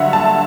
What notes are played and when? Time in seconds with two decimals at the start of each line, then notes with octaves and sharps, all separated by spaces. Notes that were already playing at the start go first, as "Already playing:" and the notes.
Already playing: G2 D3 F#3 E5 F#5
0.13 A5